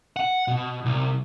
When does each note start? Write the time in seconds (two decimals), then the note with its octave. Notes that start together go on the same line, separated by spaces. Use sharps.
0.16 F#5
0.48 B2
0.86 C2